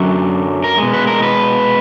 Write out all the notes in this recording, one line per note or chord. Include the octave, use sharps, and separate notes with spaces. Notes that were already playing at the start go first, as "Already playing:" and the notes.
Already playing: F#2 D3 F#3
A#4
B2 G#3
B4
A#4
B4